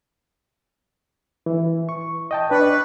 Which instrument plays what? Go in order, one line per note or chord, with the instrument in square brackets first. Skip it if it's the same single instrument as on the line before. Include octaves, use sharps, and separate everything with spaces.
[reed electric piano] E3
C#6
D#5 G5 A5
[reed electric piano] D4 D5 C#6 [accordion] B4